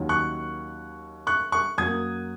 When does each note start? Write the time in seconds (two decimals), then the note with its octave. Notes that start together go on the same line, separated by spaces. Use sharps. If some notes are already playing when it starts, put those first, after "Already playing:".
Already playing: D#2 D#3 F#3 C#4
0.09 C#6 F#6
1.27 C#6 F#6
1.52 C#6 F#6
1.78 F#2 F#3 A#3 D#6 G#6